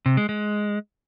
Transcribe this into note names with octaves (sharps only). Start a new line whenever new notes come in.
C3
G#3
G#3